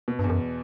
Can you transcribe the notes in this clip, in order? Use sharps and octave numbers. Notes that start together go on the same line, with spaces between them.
B2
G2
E2
F#2